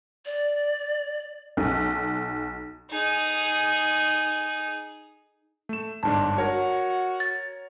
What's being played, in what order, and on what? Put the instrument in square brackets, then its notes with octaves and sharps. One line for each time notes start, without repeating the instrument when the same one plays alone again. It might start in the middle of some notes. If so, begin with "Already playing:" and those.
[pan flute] D5
[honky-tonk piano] B1
[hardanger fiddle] D#4 G#4
[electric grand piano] A3 E7
[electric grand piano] G1 G#2 D4 [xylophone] A5
[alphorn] F#4 [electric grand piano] A#4 C#5
[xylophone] A6